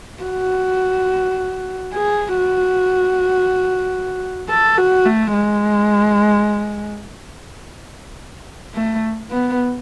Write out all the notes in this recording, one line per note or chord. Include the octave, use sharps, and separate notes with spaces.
F#4
G#4
F#4
A4
F#4
A3
G#3
A3
B3